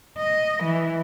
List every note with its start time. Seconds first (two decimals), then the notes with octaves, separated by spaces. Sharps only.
0.18 D#5
0.63 E3